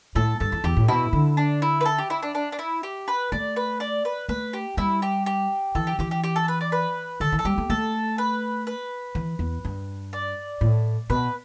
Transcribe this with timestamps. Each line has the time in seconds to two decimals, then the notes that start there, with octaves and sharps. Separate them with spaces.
0.15 A2 A4
0.40 G2 A4
0.52 E2
0.64 E2 G4
0.77 A2
0.88 B2 E4
1.13 D3
1.37 D4
1.62 E4
1.81 B4
1.85 A4
1.98 G4
2.10 E4
2.22 D4
2.35 D4
2.52 D4
2.59 E4
2.83 G4
3.08 B4
3.32 A3 D5
3.56 B4
3.80 D5
4.05 B4
4.29 A3 B4
4.53 G4
4.77 G3 E4
5.02 G4
5.26 G4
5.75 E3 A4
5.87 G4
5.99 E3 G4
6.11 G4
6.24 G4
6.36 A4
6.48 B4
6.61 D5
6.72 B4
7.20 D3 A4
7.32 E3
7.39 A4
7.45 G3 G4
7.58 A3
7.70 A3 A4
8.18 B4
8.67 B4
9.15 E3
9.39 E2
9.65 G2
10.13 D5
10.61 A2
11.10 B2 B4